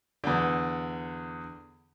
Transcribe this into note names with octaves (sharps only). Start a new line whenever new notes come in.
E2 D3